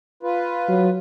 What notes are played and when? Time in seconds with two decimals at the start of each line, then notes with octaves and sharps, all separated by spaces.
0.23 F4 B4
0.69 F#3